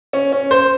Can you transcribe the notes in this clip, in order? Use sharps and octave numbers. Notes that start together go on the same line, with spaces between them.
C#4
C#4
C5